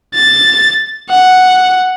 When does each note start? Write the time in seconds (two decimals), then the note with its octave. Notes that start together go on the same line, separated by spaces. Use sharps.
0.14 A6
1.10 F#5